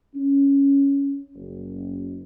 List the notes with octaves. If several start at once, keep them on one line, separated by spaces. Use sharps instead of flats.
C#4
F#1